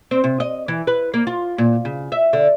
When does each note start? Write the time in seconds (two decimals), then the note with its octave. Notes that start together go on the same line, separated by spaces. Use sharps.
0.11 C4
0.24 C3
0.40 D#5
0.68 E3
0.87 B4
1.14 A#3
1.27 F4
1.58 A#2
1.85 C#3
2.12 E5
2.33 D3